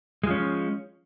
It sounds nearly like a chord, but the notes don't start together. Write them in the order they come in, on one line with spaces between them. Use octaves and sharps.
G#3 F3 C#4